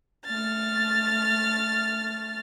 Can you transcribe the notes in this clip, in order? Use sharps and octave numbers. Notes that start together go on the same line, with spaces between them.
A3 F6 A6